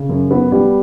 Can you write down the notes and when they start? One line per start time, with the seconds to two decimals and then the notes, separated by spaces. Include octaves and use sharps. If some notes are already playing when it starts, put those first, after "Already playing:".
Already playing: C#3
0.09 F#2
0.31 B3
0.52 G3